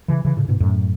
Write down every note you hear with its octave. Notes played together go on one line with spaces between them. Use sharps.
C#3 E3
C#3 E3
A2 C#3
G#2 B2
F#2 A2